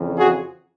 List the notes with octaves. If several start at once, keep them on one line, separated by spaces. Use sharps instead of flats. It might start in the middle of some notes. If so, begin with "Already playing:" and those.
Already playing: F2 C#3 E3
F#4 G#4